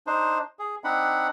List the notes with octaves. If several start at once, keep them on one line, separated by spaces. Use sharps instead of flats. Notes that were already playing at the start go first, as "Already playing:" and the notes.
D4 D#4 C5
G#4
C4 D4 D#4 F#5 B5